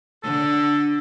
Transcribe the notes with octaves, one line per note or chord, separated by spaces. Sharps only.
D3 A4